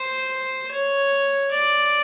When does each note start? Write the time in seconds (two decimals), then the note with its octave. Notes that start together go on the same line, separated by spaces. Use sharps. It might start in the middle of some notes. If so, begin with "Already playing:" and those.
Already playing: C5
0.72 C#5
1.51 D5